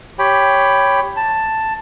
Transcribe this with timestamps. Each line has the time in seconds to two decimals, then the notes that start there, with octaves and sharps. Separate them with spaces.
0.19 G4 C#5 G5 B5
1.16 A5